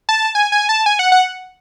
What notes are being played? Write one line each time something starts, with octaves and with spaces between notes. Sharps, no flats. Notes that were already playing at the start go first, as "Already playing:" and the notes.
A5
G#5
G#5
A5
G#5
F#5
F#5